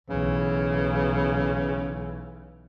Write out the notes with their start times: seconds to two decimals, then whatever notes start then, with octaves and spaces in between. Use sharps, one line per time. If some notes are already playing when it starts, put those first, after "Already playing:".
0.10 B1 C#3 E3